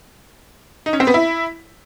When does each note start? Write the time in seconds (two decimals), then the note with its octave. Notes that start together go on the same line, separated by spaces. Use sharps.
0.86 D#4
0.93 C#4
1.00 C4
1.07 B3
1.14 E4